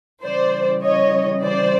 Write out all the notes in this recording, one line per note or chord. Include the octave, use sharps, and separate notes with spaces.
C#3 E3 G3 C5 D5
C#5 D#5
C5 D5